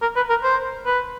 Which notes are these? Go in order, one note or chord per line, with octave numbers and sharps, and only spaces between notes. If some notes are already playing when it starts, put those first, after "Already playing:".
A#4
B4
A#4
C5
B4